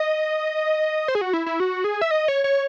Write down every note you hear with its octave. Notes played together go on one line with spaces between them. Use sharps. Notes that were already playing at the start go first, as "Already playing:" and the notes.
Already playing: D#5
C5
G#4
F#4
E4
E4
F#4
G#4
E5
D#5
C#5
C#5